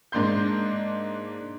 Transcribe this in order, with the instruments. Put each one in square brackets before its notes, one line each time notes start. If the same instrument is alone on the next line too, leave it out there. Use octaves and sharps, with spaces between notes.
[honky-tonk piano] G#2 A#3 D4 C6 G6